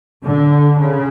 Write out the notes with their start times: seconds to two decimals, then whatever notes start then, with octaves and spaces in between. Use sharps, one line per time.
0.24 D3
0.78 C#3